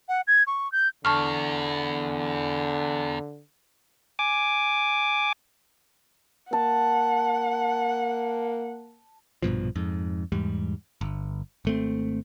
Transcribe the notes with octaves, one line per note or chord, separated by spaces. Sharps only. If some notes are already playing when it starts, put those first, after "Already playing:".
F#5
G#6
C#6
G6
E2 D3 A5 C#6 F6
G#5 D6
A#3 F#5 A5
A#1 G2 B2 F3
F2 G#2
E2 G#2 G3
G1
G#1 A3 C4